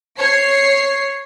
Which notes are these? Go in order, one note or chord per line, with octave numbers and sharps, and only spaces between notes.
C#5 C7